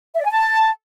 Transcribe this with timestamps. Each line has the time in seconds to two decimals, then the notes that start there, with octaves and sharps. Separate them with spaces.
0.14 E5
0.20 D5
0.25 G#5
0.31 A5